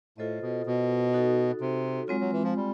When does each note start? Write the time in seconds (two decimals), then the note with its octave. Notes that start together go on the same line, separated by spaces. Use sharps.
0.18 A2 F4 A4 C5 D#5
0.42 B2
0.66 B2
1.13 D#4 F#4 A4
1.61 C3
2.08 F#3 G#3 C4 F4
2.20 F#3
2.32 E3
2.43 F3
2.56 G3